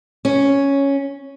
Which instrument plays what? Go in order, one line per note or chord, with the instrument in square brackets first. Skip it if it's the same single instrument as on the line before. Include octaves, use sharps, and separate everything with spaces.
[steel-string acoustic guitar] C#4